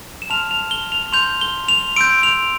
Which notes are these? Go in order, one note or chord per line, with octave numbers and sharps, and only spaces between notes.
E7
A5 C6 F6 F7
F7
G7
F7
C6 G6 F7
G7
F7
C6 E6 G6 D7
F7